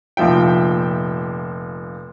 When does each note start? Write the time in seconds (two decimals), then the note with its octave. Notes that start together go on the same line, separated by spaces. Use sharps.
0.17 F1 A#2 F3 E5 G5